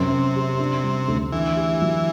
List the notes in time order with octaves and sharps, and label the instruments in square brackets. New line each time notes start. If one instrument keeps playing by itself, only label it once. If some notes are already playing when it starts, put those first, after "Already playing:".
Already playing: [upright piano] F#2 [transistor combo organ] C3
[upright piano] C4
G4
D4
G3
D2
[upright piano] D3 [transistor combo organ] E3
[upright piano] G4
F#3